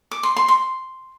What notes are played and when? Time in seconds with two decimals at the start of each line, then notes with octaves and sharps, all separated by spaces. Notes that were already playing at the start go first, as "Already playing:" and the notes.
0.11 D6
0.23 C6
0.36 C6
0.48 C6